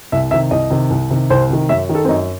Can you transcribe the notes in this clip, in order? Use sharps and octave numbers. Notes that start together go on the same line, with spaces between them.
C2 E5
C3 D#3 E5
C2 D#5
C3 D#3
C2
C3 D#3
C2 C5
C3 D#3
F#2 E5
D#3
A4
C4
F#2 D#4